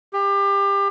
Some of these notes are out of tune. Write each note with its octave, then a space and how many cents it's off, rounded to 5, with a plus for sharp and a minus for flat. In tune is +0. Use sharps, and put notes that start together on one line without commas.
G4 +25